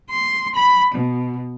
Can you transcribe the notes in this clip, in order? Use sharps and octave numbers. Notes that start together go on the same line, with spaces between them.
C6
B5
B2